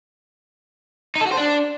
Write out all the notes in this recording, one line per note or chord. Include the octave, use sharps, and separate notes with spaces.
D#4
A4
F#4
C5
D4